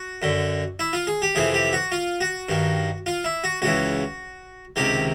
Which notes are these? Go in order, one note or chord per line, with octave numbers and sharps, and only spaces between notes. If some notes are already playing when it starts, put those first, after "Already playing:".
Already playing: F#4
F#2 D3
E4
F4
G#4
G4
F2 C3 E3 G#4
G4
F#4
F4
F#4
G2 D#3
F4
E4
F#4
C#2 C#3 E3 F#4
C#2 C3 D#3 G4